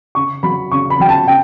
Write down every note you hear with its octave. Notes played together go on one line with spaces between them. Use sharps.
C#3 C#6
F#3 B5
C#3 C#6
B5
F#3 G5
A5
C#3 G5